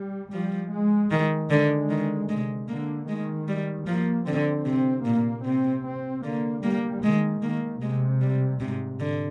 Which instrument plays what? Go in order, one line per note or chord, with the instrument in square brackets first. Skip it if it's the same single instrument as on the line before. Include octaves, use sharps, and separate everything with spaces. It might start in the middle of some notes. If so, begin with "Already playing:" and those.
Already playing: [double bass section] G3
[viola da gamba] F3 [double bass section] G3
[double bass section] G#3
[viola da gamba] D#3 [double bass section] G#3
[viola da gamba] D3 [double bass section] G#3
[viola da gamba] D#3
[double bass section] C3 [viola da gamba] G#3
[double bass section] D3 [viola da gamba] A#3
[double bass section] D#3 [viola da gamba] G#3
[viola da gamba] G3
[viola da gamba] F3 [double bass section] A#3
[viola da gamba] D3 [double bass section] C4
[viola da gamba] C3 [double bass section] C4
[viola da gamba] A#2 [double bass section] A#3
[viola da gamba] C3 [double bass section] C4
[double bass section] C4
[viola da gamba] D3 [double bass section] A#3
[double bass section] G3 [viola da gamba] A#3
[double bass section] D#3 [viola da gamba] G#3
[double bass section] D#3 [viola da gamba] A#3
[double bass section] C3 [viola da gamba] G#3
[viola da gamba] G3
[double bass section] G#2 [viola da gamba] C3
[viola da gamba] D3